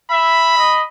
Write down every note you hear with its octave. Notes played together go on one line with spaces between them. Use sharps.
E5 B5
D#5